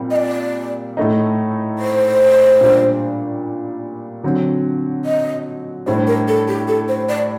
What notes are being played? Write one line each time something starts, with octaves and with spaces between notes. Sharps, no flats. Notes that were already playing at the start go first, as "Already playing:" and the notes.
Already playing: A#2 G3 C4
D#5
D5
A2 A3 D#4
C5
A#2 G3 D4
D3 F#3 C4
D#5
A2 G3 D4 C5
A#4
A4
G4
A4
C5
D5